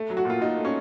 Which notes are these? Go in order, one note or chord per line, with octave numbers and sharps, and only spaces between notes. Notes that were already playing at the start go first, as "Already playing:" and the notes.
Already playing: A3
F#3
F#4
A#2 F4
A#2 D#4
A3
C#4